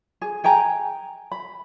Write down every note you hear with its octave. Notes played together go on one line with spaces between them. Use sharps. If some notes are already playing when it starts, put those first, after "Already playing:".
G#4
G#4 G5 G#5 A#5
B5